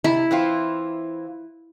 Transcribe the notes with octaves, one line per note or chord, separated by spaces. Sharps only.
C3 E4
E3 C4 F4